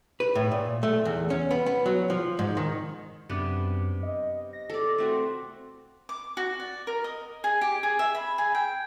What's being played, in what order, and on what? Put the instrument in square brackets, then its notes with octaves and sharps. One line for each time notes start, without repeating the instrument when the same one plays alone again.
[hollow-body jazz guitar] B4
A2
A#2
A3
E2
C#4
B3
B3
F#3
F3
G#2
D#3
[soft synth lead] F#2 [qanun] C3 B3 D4
[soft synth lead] D#5
A#6
[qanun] A4 D5
[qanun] A3 C4 F#4 [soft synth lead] C6
[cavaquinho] D6
F#4
D5
A#4
D#5
G#4
G4
G#4
E5
B5
G#4
G5